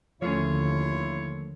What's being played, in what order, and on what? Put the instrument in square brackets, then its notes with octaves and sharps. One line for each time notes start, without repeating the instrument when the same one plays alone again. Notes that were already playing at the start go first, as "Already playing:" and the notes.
[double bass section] D#2 D3 [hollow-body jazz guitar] F3 A3 C#4 [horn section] E4 F4 C#5